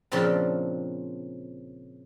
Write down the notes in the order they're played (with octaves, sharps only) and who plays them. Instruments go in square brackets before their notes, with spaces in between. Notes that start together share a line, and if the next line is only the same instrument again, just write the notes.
[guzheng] A#2 C#3 F3 C4 D4 A4